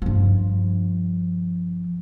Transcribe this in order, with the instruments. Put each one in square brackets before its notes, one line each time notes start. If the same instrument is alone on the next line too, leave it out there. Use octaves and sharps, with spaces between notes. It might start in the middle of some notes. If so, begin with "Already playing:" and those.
[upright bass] G2 F3